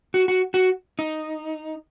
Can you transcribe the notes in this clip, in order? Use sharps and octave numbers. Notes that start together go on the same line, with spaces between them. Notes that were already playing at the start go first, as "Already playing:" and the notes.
F#4
F#4
F#4
D#4